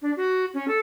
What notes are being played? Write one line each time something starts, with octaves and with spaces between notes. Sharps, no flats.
D4
F#4
C#4
A4